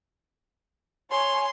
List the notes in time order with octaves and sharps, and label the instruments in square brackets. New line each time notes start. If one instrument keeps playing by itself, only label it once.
[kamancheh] C#5 G#5 [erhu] C6